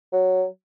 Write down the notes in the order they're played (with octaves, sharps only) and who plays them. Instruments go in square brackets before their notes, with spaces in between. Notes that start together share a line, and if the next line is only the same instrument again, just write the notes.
[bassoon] F#3